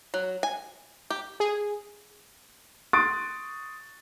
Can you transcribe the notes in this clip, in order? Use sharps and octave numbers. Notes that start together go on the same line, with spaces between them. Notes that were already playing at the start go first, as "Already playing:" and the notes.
F#3
G#5
G4
G#4
C6 C#6 D#6 F#6 A6 D7